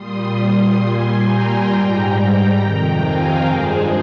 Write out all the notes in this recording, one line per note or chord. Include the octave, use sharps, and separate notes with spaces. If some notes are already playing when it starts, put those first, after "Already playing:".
Already playing: A#2 G3 C6 D#6
A#2 G3 G#5 C6
G5 A#5
G#2 G3 G5 A#5
F2 C3 D#3 G5 A#5
F5 G#5
G2 F3 G#3 G#4 C5